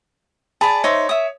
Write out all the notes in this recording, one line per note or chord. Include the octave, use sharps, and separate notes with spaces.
G#4 D5 A5 B5
D#4 C5 C#5 E5
E5 D#6